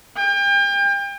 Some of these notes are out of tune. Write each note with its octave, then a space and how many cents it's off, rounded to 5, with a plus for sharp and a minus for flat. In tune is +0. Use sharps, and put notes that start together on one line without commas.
G5 +35